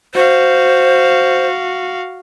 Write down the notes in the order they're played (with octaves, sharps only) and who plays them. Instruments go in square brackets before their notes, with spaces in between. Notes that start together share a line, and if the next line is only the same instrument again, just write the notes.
[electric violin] F#4 F5 [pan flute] C5